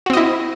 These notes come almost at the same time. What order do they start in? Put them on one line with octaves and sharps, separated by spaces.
F#4 C4 D#5 E4